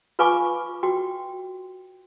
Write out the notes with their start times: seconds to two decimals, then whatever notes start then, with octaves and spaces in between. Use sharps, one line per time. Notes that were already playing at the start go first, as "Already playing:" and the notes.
0.19 F4 B4 F5 G#5 C#6 D6
0.83 F#4 G5